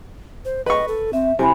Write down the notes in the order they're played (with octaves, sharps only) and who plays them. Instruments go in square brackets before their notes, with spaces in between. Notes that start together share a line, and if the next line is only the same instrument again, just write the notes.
[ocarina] C5
[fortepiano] B4 C#6 [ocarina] D#5
[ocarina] A4
[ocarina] C4 [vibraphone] E5
[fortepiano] C3 [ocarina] E4 [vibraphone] G#5 B5